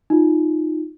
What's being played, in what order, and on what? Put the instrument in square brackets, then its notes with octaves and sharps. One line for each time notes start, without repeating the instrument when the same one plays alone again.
[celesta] D#4 F4